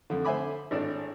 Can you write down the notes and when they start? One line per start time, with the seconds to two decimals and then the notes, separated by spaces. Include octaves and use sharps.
0.10 F2 D3
0.25 D3 C5 E5 G#5 B5 D6
0.71 G#1 A2 D4